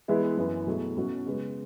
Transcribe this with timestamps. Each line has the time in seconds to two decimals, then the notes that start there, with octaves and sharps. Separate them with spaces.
0.08 E3 G#3 B3 E4 G#4
0.37 F#2 E3 B3 E4
0.67 B2 F#3 A3 E4 G#4
0.96 B2 F#3 C#4 F#4
1.26 C#3 G#3 B3